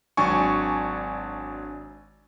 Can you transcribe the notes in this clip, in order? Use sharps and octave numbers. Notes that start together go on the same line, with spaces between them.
G#1 F#3 D4 G#5 C#6